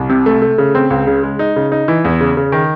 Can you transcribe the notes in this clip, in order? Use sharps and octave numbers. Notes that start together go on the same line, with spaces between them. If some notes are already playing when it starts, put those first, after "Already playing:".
Already playing: C2
C3
A3
A3
C#3
C4
C#2
C#3
G#3
D#4
C#3
D#4
E3
E2
C#3
C#3
D#3